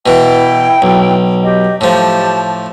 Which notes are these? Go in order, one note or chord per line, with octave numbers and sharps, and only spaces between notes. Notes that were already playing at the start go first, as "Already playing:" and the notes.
B2 E3 E4 G5
B1
G4 D#5
A2 F3 G4 A5